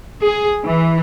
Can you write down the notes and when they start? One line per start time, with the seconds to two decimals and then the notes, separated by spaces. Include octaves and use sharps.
0.22 G#4
0.65 E3